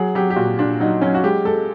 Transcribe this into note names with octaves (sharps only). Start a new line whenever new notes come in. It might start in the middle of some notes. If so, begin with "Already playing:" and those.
Already playing: F#3 G#4
F#3 G4
G4
A#2 F#4
A#2 D4
F#3 D#4
F#3 C#4
F#4
G#3 G4
G#3 A4